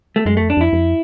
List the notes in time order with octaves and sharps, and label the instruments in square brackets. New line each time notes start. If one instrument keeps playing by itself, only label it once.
[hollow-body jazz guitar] A3
[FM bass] F#2 [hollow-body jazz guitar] G#3
[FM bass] F2 [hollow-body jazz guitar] A3
[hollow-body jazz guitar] D4
[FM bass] F2 [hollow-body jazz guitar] E4
[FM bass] F2